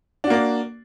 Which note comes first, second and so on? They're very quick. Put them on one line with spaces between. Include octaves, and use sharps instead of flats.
D4 F#4 A#3 D5